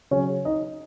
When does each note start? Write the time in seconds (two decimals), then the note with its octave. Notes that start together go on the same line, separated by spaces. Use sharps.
0.11 C#3 F#3 C#4 C#5
0.45 D#4 D#5